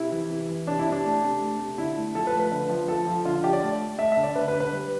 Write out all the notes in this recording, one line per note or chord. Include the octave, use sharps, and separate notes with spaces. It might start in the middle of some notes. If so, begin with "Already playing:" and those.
Already playing: C3 E4
E3
C3
E3
C3 D4
E4
C3
D4
A3
C3
A3
C3
D3 E4
A3
F3 A4
B4
A3
B4
D3
F3
F3 A4
F3
D3 F4
D3 G4
D5
A3
A3
A3 E5
E5
D3
D5
D3 B4
B4
D3
B4
G3